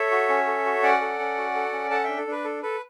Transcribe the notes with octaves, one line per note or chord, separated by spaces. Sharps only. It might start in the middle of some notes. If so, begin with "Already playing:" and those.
Already playing: A4 C#5 E5
F#4
C#4
A4
F#4
C#4 D5 F#5
A4
C#4
F#4
A4
C#4
A4 F#5 A5
D4 E5 G5
A4
D4 B4
A4
A4 B4